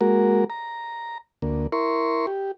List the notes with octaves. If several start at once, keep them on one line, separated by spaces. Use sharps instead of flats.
G#3 A#3 F#4 A#4
A#5
D2 A#3
E4 A#4 C6 C#6
G4